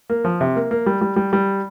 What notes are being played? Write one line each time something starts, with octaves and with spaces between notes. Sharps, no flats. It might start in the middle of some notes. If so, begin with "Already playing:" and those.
A#3
F3
C3
A#3
A#3
G3
G3
G3
G3